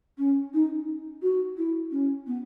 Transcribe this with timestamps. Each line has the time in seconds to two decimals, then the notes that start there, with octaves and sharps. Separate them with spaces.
0.18 C#4
0.54 D#4
1.22 F#4
1.57 E4
1.91 C#4
2.27 B3